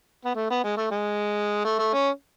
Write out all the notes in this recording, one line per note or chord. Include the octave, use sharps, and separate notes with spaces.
B3
A3
B3
G#3
A3
G#3
A3
A3
C#4